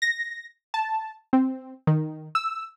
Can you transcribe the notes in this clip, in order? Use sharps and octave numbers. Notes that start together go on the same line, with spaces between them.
A#6
A5
C4
D#3
E6